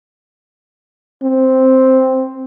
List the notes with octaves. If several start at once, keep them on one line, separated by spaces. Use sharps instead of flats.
C4